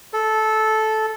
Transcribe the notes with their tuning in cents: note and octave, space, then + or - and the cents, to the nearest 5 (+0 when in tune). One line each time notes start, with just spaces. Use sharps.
A4 -15